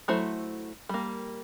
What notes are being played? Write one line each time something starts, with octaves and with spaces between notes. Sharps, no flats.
F#3 A3 E4 C5
G3 A#3